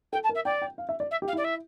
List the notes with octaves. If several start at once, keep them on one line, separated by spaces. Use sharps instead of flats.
A4 G5
A5
A#4
E5
D5 G5
G5
F5
E5
D5
E5
G4
F5
E4 D5
E5